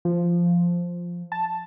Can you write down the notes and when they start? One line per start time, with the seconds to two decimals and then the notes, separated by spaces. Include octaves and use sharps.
0.05 F3
1.32 A5